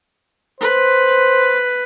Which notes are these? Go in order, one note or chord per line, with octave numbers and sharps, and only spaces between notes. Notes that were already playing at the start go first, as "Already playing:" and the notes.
B4 C5